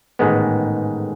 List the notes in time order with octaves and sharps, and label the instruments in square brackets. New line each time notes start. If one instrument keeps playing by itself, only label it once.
[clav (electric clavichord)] A1 G#2 D#3 G#3 B3